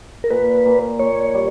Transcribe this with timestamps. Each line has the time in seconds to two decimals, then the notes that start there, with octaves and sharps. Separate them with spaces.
0.24 A#4
0.30 A#2 B4
0.66 A#2
0.99 A#2 C#5
1.34 G3